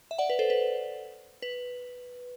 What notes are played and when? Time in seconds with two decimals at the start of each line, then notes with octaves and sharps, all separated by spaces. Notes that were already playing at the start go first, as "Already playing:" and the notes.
0.11 E5
0.18 D5 F#5
0.30 B4
0.39 A4 C5
0.50 B4
1.42 B4